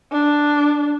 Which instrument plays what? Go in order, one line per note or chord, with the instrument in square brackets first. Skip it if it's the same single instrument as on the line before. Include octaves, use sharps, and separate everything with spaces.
[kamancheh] D4